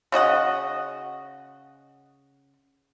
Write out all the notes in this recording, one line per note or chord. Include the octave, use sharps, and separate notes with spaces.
C#3 F#4 D#5 F#5